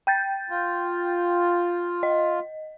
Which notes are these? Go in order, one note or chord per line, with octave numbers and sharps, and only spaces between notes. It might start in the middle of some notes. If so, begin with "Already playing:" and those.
G5 G6 A6
F4
D#5